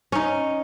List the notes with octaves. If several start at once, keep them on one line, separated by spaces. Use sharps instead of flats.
C#4 D#4